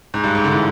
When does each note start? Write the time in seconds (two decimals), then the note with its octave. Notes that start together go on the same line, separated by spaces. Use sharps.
0.14 G#2
0.24 G2
0.35 G#2
0.44 D3
0.52 E3